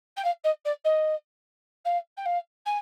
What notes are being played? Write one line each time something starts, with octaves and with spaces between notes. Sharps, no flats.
G5
F5
D#5
D5
D#5
F5
G5
F5
G#5